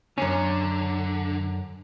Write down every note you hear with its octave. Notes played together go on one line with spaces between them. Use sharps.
F#2 D3 C#4